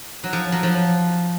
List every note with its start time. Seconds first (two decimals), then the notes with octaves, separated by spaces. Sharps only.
0.24 F#3
0.33 F3
0.52 F#3
0.63 F3